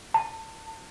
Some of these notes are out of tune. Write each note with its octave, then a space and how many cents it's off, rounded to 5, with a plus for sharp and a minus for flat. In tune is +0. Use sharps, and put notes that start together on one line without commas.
A5 +25